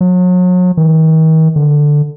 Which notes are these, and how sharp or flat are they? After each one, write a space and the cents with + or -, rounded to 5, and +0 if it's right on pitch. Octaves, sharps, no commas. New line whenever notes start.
F#3 -35
D#3 +40
D3 +5